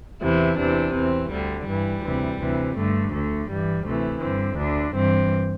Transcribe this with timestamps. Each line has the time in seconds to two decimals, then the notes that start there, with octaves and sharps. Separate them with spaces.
0.22 E2 C3 E3 E4
0.59 E2 C3 E3 D4
0.95 E2 E3 C4
1.31 D2 D3 G3
1.68 G2 E3 G3
2.04 D2 C3 E3
2.40 D2 C3 E3
2.77 G2 D3 A3
3.13 D2 D3 A3
3.49 G2 E3 G3
3.86 D2 C3 E3 A3
4.21 G2 D3 C4
4.58 D2 D3 D4
4.94 G2 E3 C4